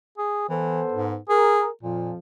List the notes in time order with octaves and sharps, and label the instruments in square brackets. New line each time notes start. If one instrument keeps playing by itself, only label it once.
[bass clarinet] G#4
[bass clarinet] E3 [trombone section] B3 A4 C5
[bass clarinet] G#2
[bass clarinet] G#4 [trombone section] A#4
[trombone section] F2 F3 [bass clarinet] A#2